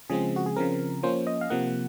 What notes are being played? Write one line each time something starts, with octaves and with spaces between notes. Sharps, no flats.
C#3 F3 G#3 C4 G#4
F#4
G#4
C#3 F3 C4 A#4
F3 A#3 C#4 C5
D#5
F5
C3 F3 A#3 F#5